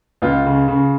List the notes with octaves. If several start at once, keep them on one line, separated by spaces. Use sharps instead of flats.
C#2 F4
C#3
C#3